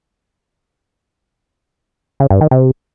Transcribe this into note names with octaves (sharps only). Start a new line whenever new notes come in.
C#3
G2
D#3
C3